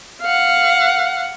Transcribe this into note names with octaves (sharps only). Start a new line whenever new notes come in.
F5 F#5